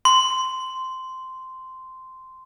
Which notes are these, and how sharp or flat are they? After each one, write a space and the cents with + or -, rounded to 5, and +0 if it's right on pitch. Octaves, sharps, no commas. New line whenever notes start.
C6 -10